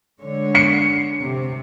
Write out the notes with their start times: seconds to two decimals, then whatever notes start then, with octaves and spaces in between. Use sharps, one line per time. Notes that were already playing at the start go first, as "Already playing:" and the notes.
0.21 D3 G#3 C#5
0.55 C7 C#7
1.19 C3